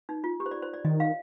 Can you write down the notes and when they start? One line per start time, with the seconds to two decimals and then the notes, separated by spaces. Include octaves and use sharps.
0.09 D#4
0.24 F4
0.40 G4
0.46 C5
0.51 D5
0.62 C5
0.74 D5
0.84 D#3 D#5
1.00 F5